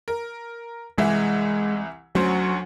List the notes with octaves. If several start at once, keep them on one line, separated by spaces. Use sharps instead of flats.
A#4
C2 E3 G#3 E4
D2 F#3 C#4 C5